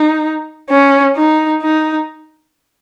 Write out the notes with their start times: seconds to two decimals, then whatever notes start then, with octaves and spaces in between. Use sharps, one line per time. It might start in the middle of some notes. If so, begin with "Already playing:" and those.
Already playing: D#4
0.70 C#4
1.17 D#4
1.62 D#4